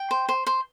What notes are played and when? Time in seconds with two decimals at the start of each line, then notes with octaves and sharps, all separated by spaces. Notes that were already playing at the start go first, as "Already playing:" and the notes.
Already playing: G5
0.11 C5
0.29 C5
0.47 C5